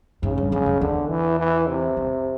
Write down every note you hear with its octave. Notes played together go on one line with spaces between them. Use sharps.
G#2 C#3
G2
F#2 C#3
F#2
E2 D3
E3
E3
C3
F2